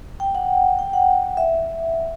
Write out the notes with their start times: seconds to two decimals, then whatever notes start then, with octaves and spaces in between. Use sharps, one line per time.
0.20 G5
0.35 F#5
0.79 G5
0.93 F#5
1.37 E5